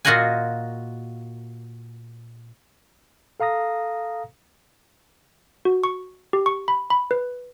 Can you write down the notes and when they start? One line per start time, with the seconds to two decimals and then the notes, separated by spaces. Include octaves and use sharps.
0.05 A#2 F4 F#4 D#5 F#5 G#5
3.40 A4 F5 A#5 D#6 A#6
5.65 F#4
5.84 C#6
6.33 G4
6.46 C#6
6.68 B5
6.90 B5
7.11 B4